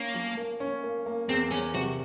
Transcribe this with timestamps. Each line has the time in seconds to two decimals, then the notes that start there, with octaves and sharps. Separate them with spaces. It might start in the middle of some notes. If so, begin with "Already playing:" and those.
Already playing: A#3 C#4
0.14 F3
0.37 A#3
0.60 C#4
0.83 A#3
1.06 A#3
1.29 E2 C4
1.51 E2 C#4
1.74 C3 F#4